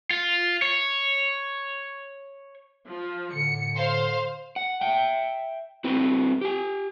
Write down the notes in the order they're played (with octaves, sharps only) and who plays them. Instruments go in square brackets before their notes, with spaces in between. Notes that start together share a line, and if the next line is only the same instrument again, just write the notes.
[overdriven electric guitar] F4
C#5
[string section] F3
[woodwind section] A2 D3 [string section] C#7
[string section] C5 F5 C6
[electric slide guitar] F#5
E5 G5
C4 E4 F#4 B4
G4 G#5